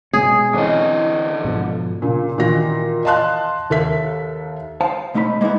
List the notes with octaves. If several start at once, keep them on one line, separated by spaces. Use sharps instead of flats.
B2 G#3 C#4 G#4
D3 E3 C4 C#4 D#5
G#2 B2 F3
A#2 C#3
A#2 D#3 E3 F#4 A#6
D#5 F5 A5 C6 F#6
D#2 A4 E5 B6
C5 F5 A5
B2 A3 D#4 C5 B5
G#3 A#3 B3 D#4 E4